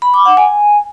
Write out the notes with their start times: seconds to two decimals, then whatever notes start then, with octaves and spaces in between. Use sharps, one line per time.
0.02 B5
0.14 D6
0.25 F#5
0.37 G#5